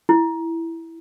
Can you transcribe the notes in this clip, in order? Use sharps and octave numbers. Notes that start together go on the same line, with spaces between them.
E4